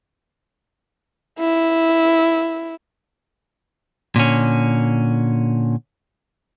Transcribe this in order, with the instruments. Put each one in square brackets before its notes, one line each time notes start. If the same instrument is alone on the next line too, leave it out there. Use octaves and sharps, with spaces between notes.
[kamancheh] E4
[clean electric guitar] A#2 D3 C#4